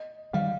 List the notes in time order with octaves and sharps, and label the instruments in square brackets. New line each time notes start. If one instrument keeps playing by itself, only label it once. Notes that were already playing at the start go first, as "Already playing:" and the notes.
Already playing: [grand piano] D#5
[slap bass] D#3 G3 [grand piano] F5